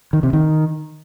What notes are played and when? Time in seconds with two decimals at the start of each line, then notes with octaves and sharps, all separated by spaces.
0.13 D#3
0.23 C3
0.33 D#3